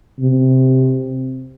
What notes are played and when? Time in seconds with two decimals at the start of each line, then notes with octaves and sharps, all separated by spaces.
0.20 C3